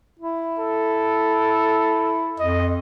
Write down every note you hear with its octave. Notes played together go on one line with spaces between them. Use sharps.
E4
A4
F2 D#5